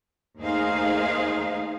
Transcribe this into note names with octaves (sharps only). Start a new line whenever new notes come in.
D#2 A3 D#4 G#4 C5 F5